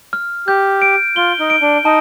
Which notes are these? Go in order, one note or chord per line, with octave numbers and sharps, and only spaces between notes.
F6
G4 G6
D7
F4 G7
D#4
D7
D4
D#4 A5